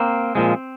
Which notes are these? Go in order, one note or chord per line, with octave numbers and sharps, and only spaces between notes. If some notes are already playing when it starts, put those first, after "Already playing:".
Already playing: A#3 C4
A#2 F3 G#3